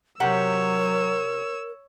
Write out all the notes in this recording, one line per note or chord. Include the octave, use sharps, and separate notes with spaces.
C3 F#3 G4 A#4 C#5 F#5 E6